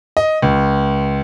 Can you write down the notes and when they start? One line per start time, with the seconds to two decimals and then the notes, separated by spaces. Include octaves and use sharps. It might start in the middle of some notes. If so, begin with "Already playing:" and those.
0.17 D#5
0.42 C#2